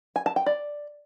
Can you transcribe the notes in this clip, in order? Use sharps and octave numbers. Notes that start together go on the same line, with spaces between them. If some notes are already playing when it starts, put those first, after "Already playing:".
G#5
A5
G5
D5